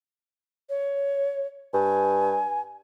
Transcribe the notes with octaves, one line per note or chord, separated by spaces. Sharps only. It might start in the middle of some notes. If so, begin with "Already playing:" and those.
C#5
G2 G#5